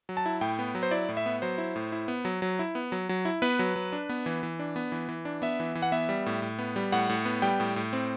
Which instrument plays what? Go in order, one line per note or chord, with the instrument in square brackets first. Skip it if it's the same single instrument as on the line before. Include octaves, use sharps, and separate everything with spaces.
[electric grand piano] F#3
A5
E4
A2 G5
B3
F#3
C5
E4 D5
A2
E5
B3
F#3 C5
E4
A2
E4
B3
F#3
F#3
E4
B3
F#3
F#3
E4
B3 B4
F#3
F#3
D4
B3
E3
E3
D4
B3
E3
E3
D4
B3 E5
E3
E3
F#5
B3 E5
G3
A2
A2
B3
G3
A2 F#5
A2
B3
G3 G5
A2
A2
C4